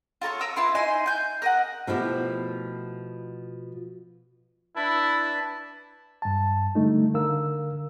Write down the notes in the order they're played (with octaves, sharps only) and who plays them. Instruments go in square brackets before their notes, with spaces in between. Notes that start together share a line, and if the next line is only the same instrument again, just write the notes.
[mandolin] F4 A4 A#4 C#5
A#4 A#5 D#6 E6
E4 F4 B4
D#4 E4 G#5 C6
G#5 G6
A#4 D#5 F#5
[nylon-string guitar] B2 F3 A3 E4 G4
[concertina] D4 B4 A5 [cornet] E4
[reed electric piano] G2 A5
D3 G3 A3 D#4
D3 A#4 F5 E6